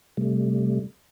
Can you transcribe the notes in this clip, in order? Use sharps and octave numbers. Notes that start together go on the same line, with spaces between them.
C3 G3 A3